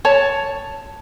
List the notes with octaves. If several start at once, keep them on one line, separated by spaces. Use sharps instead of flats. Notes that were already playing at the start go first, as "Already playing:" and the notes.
C#5 A5